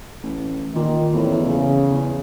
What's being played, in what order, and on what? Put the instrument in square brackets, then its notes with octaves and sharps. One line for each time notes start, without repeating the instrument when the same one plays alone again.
[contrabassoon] A1
[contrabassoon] A#2 [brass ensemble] D#3
[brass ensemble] F#1 A2 [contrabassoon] E2
[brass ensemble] C#3
[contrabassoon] E2